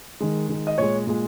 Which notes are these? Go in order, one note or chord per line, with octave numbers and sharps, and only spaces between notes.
D#3 G#3
D#3 G#3
D#5
A#2 G#3 C#5
A#2 G#3